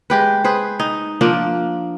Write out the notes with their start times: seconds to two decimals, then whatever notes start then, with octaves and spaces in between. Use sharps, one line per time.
0.10 G#3 G4 B4
0.44 G#4 B4 C5
0.80 D#4
1.21 F3 A#3 D4 F4